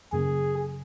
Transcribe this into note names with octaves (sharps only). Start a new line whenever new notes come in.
F#2 C#3 F#3 A#3 G#4